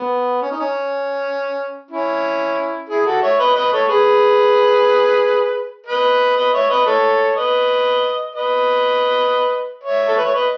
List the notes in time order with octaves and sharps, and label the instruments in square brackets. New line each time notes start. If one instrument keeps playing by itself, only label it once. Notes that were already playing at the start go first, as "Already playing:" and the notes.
Already playing: [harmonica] B3
C#4
D#4
C#4
C#4 E4
E4 G#4
F#4 A4
C#5 E5
B4 D#5
B4 D#5
A4 C#5
G#4 B4
B4 D#5
B4 D#5
C#5 E5
B4 D#5
A4 C#5
B4 D#5
B4 D#5
C#5 E5
A4
B4
C#5
B4 D#5